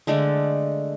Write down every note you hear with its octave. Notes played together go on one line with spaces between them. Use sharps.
D3 G#3 A3 D5